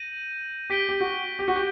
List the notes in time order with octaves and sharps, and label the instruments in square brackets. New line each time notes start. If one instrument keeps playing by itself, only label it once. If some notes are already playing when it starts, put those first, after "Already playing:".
Already playing: [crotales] G6 A#6 D#7 F#7
[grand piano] G4 [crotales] G6 B6 D7 G7
[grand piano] G4
F#4
G4
F#4
G4